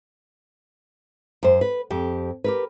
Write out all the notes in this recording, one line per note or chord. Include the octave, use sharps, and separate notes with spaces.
F#2 C5
B4
F2 G4
G4 A#4 B4